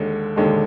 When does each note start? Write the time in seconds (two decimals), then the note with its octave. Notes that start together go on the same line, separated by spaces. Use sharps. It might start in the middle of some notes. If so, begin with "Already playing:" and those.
Already playing: D#2 D3 G#3
0.36 D#2 D3 G#3